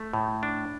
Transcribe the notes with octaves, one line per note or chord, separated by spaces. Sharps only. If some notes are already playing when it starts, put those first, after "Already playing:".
Already playing: A3
A2
D4